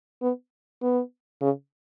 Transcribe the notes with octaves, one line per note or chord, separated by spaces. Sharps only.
B3
B3
C#3